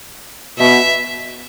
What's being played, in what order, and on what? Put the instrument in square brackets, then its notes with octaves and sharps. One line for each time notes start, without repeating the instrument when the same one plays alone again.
[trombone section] B2 [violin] E5